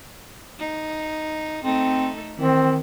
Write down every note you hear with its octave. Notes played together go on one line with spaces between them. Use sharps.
D#4
A3 C4 D#4 A4
D#3 E3 C4